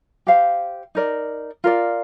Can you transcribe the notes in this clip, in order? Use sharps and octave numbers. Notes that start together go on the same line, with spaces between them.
G4 C5 F5
D#4 A#4 D5
F4 A#4 D5